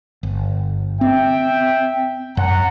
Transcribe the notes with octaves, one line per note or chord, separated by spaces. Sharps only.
G1
C4 E5 G5
F#2 F#5 A#5